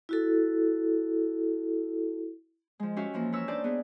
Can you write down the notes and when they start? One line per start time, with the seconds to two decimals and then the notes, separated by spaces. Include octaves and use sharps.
0.09 E4 F#4 A4
2.80 F3 G#3
2.96 C#4 F#4 G4 E5 F5 C#6
3.13 E3 F3 A#3
3.32 A#4 B4 C#5 C#6 E6
3.47 D4 D#4 C5 D5 A5
3.64 B3 G#4